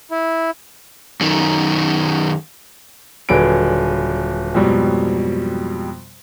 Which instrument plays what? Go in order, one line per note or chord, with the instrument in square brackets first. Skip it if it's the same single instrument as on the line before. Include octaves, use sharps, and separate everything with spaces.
[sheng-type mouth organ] E4
[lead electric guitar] F#2 D#3
[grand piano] D#1 D3 F#3 G#4 B4 D7
F2 G#2 B2 F#3 G3